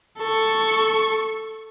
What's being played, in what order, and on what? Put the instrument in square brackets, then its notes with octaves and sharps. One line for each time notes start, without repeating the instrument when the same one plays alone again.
[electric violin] A4 C#6